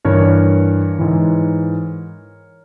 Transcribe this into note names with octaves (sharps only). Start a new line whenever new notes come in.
G2 E3 A#4 C#5
G#2 E3